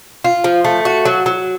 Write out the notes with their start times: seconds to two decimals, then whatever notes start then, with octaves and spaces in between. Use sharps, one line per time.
0.24 F4
0.44 F3
0.65 A3
0.85 F#4
1.05 F#3
1.26 F#3